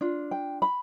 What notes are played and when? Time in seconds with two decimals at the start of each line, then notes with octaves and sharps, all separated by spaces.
0.01 D4 F4
0.31 G5
0.62 B5